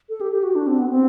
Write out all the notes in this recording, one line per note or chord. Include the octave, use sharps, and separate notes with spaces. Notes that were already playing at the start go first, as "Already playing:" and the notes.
A4
G4
G4
F#4
D4
C4
B3
C4